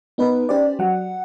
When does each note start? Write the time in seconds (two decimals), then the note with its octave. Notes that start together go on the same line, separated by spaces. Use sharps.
0.18 B3 D#4 A#4 B4
0.49 C#4 G4 C5 D5
0.79 F#3 F#5